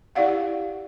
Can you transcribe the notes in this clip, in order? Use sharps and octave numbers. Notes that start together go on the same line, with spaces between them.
E4 G4 D5 F5 F#5